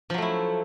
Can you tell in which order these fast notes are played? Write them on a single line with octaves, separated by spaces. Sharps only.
F3 F#3 A3 E4